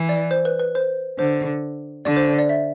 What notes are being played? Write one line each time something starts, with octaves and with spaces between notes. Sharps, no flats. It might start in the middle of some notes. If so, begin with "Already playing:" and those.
Already playing: E3
D5
C5
B4
B4
C5
D3 C5
D3 D5
C5
D5
E5